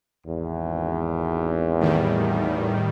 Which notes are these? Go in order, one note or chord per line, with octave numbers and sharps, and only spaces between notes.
G#1 E2
A2 D#3 G3